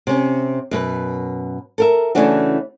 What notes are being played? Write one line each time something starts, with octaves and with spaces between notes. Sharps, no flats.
C3 C#4
F#2 B2 B4
A4 A#4 E5
C#3 E3 A3 C#4 D4 F#4